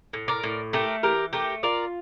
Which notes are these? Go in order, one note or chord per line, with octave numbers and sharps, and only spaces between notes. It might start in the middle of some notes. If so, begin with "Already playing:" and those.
A2
A#4 D5
A2
A3 G4 A#4
E3 G4 A#4
A3 G4 A#4
F4 A#4 D5